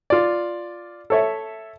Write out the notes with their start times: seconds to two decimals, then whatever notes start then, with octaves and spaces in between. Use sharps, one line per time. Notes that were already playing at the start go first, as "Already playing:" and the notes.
0.10 F4 D5
1.10 A4 C#5 E5